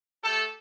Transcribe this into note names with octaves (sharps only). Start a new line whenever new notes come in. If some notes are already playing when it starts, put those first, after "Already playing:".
A3 G4 A4